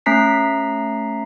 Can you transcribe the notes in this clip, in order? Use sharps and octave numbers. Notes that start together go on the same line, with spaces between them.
A3 C#4 A#5 B6 C7